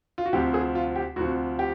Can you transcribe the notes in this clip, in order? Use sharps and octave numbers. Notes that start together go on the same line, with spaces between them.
F4
F#4
D2 C3 F3 G4
G#4
F4
G4
D2 C3 F3 F#4
G4